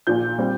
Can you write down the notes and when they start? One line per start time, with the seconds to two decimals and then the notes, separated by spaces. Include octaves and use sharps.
0.07 A#1 A#2 F3 G6
0.38 G3 C4